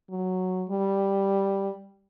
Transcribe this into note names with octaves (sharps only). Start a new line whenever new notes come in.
F#3
G3